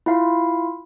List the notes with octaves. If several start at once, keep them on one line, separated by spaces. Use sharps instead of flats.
E4 F4 F5 B5